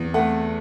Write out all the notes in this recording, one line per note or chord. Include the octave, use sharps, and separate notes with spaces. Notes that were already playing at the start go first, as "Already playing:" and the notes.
Already playing: E2
A3 F#5